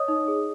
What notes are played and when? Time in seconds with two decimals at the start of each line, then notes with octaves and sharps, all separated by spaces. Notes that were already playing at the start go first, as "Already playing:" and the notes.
Already playing: C#5 D#5 D#6
0.08 D#4
0.28 G#4